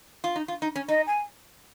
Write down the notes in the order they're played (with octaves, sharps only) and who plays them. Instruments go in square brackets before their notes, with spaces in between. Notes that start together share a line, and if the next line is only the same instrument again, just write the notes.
[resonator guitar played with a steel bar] F4
D#4
F4
D#4
C#4
[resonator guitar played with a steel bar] D#4 [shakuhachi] D#5
[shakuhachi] G#5